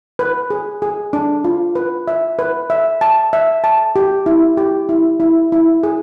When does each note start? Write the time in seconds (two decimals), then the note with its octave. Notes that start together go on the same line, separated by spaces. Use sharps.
0.19 B4
0.50 G#4
0.82 G#4
1.13 D4
1.44 F4
1.75 B4
2.08 E5
2.39 B4
2.70 E5
3.01 A5
3.33 E5
3.64 A5
3.96 G4
4.26 E4
4.57 G4
4.89 E4
5.20 E4
5.52 E4
5.83 G#4